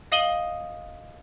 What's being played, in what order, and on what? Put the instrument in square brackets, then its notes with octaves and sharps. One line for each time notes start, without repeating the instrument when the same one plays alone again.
[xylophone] D#5 F5 D#6 D#7 F#7 G7